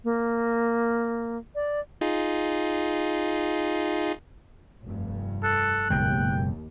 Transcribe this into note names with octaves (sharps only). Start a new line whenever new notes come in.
A#3
D5
D#4 F4 G#4
F1 G2
A4 F#6
F#1 D#2 B2 G#3 G5